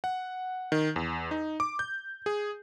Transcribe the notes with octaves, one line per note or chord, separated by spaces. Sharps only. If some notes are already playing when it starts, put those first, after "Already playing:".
F#5
D#3
E2
D#4
D6
G6
G#4